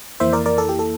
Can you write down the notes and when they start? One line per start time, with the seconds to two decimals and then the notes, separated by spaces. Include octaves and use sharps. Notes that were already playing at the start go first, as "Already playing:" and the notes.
0.20 F2 E3 A#3 E4 C5 E5
0.33 A#4 D5
0.46 A#4 D5
0.58 A4
0.69 G4
0.79 A4